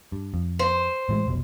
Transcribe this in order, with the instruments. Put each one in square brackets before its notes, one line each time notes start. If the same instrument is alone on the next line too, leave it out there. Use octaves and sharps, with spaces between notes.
[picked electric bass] G2
F2
[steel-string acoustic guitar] C5
[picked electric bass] A2 E3 G#3
F1 B1 B2